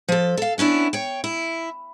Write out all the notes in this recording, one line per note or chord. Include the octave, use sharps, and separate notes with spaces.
F3 A4
A4 F5
B3 C#4 D4 E4
C#5 G5
E4